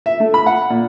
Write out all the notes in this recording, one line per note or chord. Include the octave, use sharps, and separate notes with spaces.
E5
A3
B5
F#5
A#2